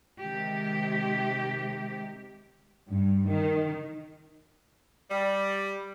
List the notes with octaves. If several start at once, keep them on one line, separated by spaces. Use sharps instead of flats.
C3 D#3 G#3 G4
G2
D#3
G3